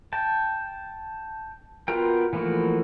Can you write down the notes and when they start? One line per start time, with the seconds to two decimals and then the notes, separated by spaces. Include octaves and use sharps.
0.13 G5 A5
1.88 B3 F4 F#4 A#4 G5
2.33 E3 F3 A3 A#3 F#4